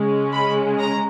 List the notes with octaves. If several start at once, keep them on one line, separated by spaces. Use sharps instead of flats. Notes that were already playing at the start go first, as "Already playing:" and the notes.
Already playing: C#3 G#3 C#4
B5
A#5